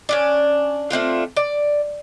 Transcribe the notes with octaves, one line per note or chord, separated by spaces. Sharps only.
C#4 D4 D5
A3 C4 D4 F4
D5